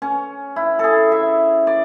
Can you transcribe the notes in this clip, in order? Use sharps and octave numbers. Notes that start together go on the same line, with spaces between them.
C#4
E4
G#4 A4
E5
D5